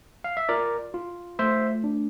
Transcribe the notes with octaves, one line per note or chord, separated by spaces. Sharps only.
F5
E5
F4 A#4 D5
F4
A3 C5 E5
D4